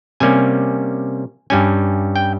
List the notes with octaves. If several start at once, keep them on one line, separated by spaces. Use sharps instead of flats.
C3 G3 A#3 C#4 G#5
G2 G3 C#4 G#5
G5